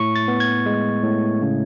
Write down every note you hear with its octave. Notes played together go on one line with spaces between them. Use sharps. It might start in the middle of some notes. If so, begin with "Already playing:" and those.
Already playing: A2 C#6
A6
B3
G#6
G#3
A2
C#3